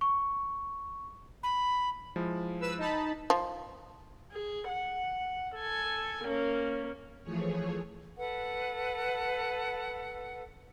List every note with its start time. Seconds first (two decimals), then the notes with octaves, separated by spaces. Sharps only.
0.01 C#6
1.43 B5
2.16 F3 G#3 E4
2.61 B4 E6
2.78 D#4 A5 B5
3.30 F3
4.32 G#4
4.69 F#5
5.55 A4 G#5
6.24 A#3 C#4
7.23 E3 F3 A3 G#4 C#5
8.17 A4 B4 F#5